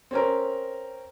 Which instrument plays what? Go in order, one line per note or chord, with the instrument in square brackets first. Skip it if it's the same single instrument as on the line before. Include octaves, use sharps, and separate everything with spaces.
[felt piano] C4 C#4 A#4